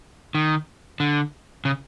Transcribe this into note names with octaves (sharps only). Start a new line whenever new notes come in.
D#3
D3
C#3